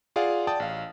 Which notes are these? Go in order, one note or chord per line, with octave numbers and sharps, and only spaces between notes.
F4 G#4 D5 F5 F#5
D5 G5 A5 D#6 A6
A1 F5